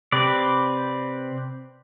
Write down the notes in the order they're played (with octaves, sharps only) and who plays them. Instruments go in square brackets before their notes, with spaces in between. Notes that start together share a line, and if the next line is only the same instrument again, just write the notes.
[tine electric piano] C3 [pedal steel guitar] C4 B4 D5